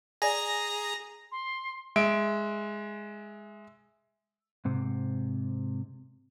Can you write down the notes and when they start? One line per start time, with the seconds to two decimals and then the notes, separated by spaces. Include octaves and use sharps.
0.22 G#4 D5 G#5 A#5 A#6
1.32 C6
1.96 G#3 E5 D7
4.65 G#2 C3